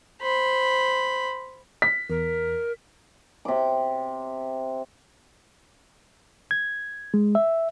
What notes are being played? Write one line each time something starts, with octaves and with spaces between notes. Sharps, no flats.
C5 B5
B6
E2 A#4
C3 D6
G#6
G#3
E5